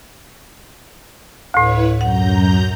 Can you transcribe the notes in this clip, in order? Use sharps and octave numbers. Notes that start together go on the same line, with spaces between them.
D2 A2 E4 B4 C#5
F#2 F#5 A#5 G6